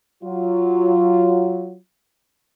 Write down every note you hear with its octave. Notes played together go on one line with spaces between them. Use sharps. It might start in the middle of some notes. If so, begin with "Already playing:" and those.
F#3 F4